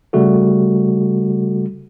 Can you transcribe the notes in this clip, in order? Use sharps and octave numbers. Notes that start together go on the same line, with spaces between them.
C#3 G3 A3 F#4 A4